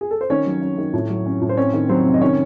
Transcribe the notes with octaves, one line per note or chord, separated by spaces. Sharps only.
G#4
A4
C5
D#3 C#4 C#5
F#3
C#4
D#3
A2
F#3
C#4
A2
C5
C4 C#4 C#5
D#3
F#3 C4 C5
C3
D#5
D#3 C#4 C#5